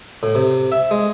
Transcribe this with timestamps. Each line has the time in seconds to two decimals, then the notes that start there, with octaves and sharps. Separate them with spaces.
0.23 A2
0.35 C3
0.72 E5
0.91 G#3